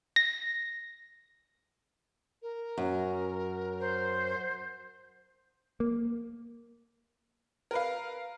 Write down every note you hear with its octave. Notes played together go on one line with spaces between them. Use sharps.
A#6
A#4
F#2
C5
A#3
A#4 B4 F5